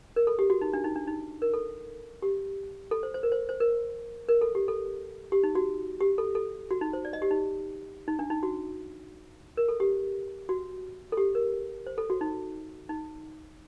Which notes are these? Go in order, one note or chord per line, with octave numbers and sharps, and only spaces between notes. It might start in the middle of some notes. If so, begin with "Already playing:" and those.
A#4
A4
G4
F#4
D#4
D4
D#4
D4
D#4
A#4
A4
G4
A4
C5
C5
A#4
C5
C5
A#4
A#4
A4
G4
A4
G4
D#4
F#4
G4
A4
A4
F#4
D#4
C5
D5
D#5
G4
D#4
D#4
D4
D#4
F#4
A#4
A4
G4
F#4
A4
G4
A#4
C5
A4
F#4
D#4
D#4